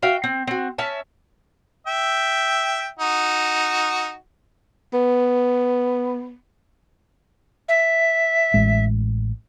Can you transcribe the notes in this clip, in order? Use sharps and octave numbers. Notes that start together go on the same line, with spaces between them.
F#4 E5 F5 G5
C4
C4 F#4
C#4 E5 A5
E5 G5
D#4 F#4
B3
E5
A1 G#3